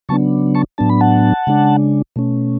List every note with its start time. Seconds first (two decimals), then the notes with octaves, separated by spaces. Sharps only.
0.09 C#3 F#3 B3 D4 A5 C#6
0.55 A5 C#6
0.78 A2 F#3 B3 D4 A5
0.89 B5
1.00 F#5 A5
1.47 C#3 G#3 D4
2.16 B2 A3 C#4